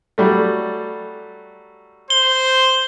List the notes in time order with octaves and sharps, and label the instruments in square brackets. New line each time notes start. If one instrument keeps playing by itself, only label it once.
[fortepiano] F#3 G3 A3
[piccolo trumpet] C5 [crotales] G7